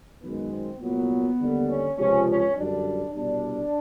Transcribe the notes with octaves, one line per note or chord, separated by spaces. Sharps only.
F#2 D#3 G#3 B3
C4
C2 A#2 F#3 B3
D#2 D3 G3
C#4
C#2 C3 F3 C#4
C#4
F#2 D3 G3 D4
C2 B2 G3 D4